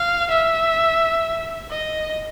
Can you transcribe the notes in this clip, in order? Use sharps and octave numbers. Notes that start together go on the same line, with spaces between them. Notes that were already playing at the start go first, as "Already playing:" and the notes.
Already playing: F5
E5
D#5